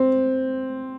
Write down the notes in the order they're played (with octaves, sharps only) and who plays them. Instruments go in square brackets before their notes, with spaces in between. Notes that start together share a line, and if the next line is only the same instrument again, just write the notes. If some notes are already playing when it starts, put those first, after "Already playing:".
Already playing: [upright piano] C4